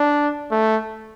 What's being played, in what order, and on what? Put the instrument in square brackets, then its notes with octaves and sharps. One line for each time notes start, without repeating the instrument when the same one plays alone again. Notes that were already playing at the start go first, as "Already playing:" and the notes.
Already playing: [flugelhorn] D4
A3